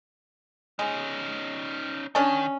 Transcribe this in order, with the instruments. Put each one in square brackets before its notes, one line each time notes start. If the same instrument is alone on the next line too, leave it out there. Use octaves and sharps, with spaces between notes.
[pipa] G#3 [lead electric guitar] C#4 D#4
[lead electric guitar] D#3 [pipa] C#4 D4 A5